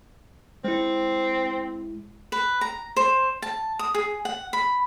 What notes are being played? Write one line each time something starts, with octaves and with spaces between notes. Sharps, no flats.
G#3 C4 E4
B4
A#5
C5
A5
D#6
G#4
F#5
B5